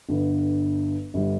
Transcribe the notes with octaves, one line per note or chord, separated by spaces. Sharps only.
G1 G2 D3
G1 D3 G3